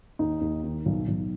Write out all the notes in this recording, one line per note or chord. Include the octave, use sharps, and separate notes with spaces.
D#2 D#4
D#2
D#3
B1
B1